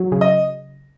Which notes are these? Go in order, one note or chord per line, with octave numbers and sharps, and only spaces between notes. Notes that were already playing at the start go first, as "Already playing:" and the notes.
Already playing: F#3
C#3
D#5